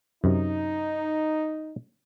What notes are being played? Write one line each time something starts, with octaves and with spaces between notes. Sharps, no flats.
F#2 C3 D#4